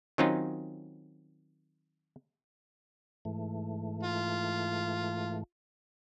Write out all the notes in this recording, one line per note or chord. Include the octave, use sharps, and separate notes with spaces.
D#3 F#3 C4 C#4 D#4 F4
G#2 E3 A3
F4